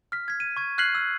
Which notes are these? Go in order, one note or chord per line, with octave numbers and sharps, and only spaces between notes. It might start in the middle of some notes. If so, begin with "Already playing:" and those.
F6 B6
G#6 B6
D#7
C#6 G#6
F6 F#6 G#6 B6 C7 F#7
E6